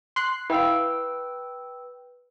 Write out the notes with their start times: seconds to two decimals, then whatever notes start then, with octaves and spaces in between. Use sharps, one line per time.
0.16 C6 F#6 C7
0.50 E4 B4 F5 G5 E6